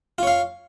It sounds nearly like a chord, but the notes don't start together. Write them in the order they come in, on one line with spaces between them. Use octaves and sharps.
F4 C#5 F5